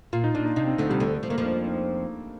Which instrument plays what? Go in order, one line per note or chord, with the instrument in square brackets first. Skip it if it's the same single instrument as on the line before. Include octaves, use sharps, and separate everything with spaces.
[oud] A#2 [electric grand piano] F4
[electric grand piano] D#4
[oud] A#2 [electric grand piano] D4
[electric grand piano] D#4
[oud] C3 [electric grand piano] D#4
[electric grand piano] C4
[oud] D2 D3 [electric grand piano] A3
[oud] C3 [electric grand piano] G3
[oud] D2 D3 [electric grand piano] A3
[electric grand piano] A3
[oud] F3
[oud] D#3 [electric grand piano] A#3
[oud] F2 F3
[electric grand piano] D4
D#4